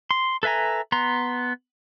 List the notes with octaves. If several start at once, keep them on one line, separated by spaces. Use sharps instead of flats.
C6
A4 B4 E5 G#5 A#5
B3 A#5 C6